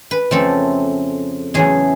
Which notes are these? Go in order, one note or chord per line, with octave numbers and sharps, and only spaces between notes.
B4
F2 C#3 F3 A3 C4 A4
E2 C#3 F#3 A3 G#4